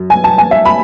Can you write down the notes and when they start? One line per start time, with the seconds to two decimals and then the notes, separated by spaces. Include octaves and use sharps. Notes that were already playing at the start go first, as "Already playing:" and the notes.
Already playing: F#2
0.10 G#5
0.24 A5
0.38 G#5
0.51 E5
0.65 B5